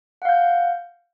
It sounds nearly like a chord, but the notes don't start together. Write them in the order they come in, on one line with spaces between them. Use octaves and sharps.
F#5 F5 G6